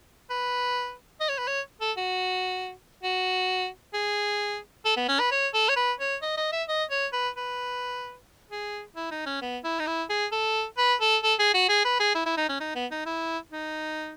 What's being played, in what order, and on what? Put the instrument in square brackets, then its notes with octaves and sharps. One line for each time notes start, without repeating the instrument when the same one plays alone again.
[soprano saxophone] B4
D#5
C#5
B4
C#5
A4
F#4
F#4
G#4
A4
B3
C#4
B4
C#5
A4
C#5
B4
C#5
D#5
D#5
E5
D#5
C#5
B4
B4
G#4
E4
D#4
C#4
B3
E4
D#4
E4
G#4
A4
B4
A4
A4
G#4
F#4
G#4
B4
G#4
E4
E4
D#4
C#4
D#4
B3
D#4
E4
D#4